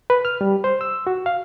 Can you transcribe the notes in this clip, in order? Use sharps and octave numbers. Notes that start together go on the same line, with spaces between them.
B4
F6
G3
C5
E6
F#4
F5